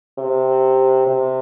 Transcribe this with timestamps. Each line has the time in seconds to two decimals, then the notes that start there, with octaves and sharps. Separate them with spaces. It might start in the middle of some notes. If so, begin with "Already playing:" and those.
0.19 C3
1.06 C3